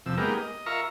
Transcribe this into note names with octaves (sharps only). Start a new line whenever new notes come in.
F2 C3 E6
G#3 A#3 B3 D#4 G4 A#4
D#5
F4 A#4 E5 A#5 C#6